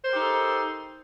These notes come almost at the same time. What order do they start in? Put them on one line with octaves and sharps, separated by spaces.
C5 A#4 G4 D#4 A4